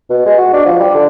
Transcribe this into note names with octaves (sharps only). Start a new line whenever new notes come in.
B2
G#3
F#4
D4
F3
G3
D3